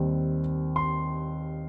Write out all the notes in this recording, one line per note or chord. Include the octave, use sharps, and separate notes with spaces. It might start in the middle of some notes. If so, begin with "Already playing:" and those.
Already playing: D#2 D#3 G3 C4 D#4
C6